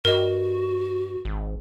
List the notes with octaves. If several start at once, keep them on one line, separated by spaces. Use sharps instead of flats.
G2 F#4 A#4 D#5
G#1